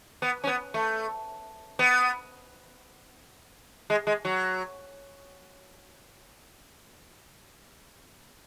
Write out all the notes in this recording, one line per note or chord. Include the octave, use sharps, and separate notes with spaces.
B3
C#4
B3
A3
B3
G#3
G#3
F#3